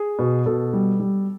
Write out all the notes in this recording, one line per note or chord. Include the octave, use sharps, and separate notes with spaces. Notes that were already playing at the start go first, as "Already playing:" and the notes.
Already playing: G#4
B2
B2 A4
G3
G3